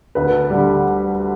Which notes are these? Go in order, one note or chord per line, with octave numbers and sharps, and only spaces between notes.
D2 B4
D3 G3